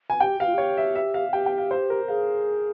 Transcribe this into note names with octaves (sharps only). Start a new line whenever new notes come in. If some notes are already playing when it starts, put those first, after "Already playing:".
G#5
G4 G5
G4 F5
F4
G4 C#5
E5
E5
F5
G4 G5
G5
F5
C5
A#4
G#4 F5